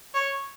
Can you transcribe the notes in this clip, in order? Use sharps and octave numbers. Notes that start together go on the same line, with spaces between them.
C#5